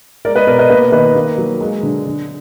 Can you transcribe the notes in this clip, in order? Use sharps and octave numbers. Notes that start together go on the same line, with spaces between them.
G#3 A#4 D5
B4 D#5
B2 A#4 D5
B4 D#5
A#3 B4 D#5
D#3 B4 D#5
A#3
F#3
G#3
D3
D3